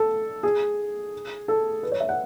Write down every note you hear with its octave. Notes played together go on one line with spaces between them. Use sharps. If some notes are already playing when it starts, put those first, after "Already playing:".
Already playing: A4
G#4
A4
B4
C#5
E5
F#5